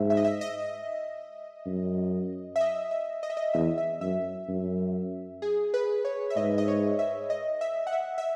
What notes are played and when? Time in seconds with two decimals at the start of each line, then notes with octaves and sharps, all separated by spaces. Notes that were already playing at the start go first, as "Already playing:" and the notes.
Already playing: G#2 E5
0.10 E5
0.17 D#5
0.25 E5
0.41 D#5
1.66 F#2
2.56 E5
2.61 D#5
2.91 E5
3.23 D#5
3.30 E5
3.37 D#5
3.54 E2 E5
3.78 E5
4.01 F#2 E5
4.48 F#2
5.42 G#4
5.74 B4
6.05 C#5
6.30 E5
6.36 G#2 D#5
6.58 D#5
6.68 C#5
6.99 E5
7.30 D#5
7.61 E5
7.87 F#5
7.92 E5
8.18 E5